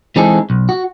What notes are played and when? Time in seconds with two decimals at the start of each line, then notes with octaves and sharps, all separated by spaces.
0.16 E3 G#3 C4 D#4 G#4 A4
0.50 B1
0.69 F#4